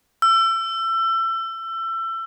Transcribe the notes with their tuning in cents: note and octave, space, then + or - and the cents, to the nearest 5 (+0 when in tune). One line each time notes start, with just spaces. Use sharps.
E6 +30